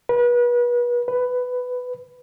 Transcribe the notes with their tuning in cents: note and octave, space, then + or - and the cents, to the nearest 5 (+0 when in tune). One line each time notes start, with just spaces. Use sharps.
B4 -35
B4 +10